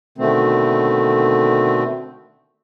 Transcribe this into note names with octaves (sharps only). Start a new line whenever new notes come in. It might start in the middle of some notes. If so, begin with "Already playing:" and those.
B2 D3 D#3 A3 C4